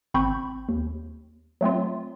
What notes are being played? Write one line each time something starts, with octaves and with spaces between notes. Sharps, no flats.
G#1 C4 B5 C#6 G6
D#2
F#3 A3 C4 F4